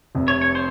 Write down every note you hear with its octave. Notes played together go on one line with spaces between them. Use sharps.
F1 F2 C3
C#5
C#5
C5